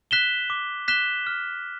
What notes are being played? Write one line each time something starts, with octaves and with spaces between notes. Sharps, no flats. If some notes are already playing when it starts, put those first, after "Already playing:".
F#6 B6 E7 G7
D6
F#6 B6 E7 G7
F6